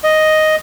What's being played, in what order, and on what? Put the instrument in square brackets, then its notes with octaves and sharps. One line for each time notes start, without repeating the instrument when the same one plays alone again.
[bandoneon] D#5